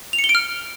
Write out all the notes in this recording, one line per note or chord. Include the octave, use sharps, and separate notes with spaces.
F7
C#7
G7
D7
F6